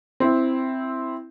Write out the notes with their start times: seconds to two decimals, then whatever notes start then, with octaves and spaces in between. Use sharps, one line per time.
0.20 C4 E4